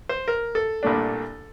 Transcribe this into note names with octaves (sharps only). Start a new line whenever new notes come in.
C5
A#4
A4
C2 A#2 A3 D4